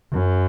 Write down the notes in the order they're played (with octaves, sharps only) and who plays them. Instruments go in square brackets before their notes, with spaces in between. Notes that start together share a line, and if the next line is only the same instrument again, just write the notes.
[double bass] F#2